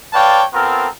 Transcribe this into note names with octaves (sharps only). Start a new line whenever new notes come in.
B4 C#5 D5 F5 G5 A5
B3 C4 F4 A4 A#4